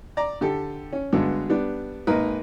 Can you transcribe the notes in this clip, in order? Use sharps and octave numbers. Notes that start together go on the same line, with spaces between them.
D5 A#5
D3 G4 A4
C#4
G2 D3 F#3 G#3 B3
G3 B3 D4
G#1 G#3 A#3 D#4 A#4 B4